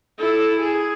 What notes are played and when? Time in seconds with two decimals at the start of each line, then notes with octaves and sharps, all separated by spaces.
0.18 E4 A4
0.59 G#4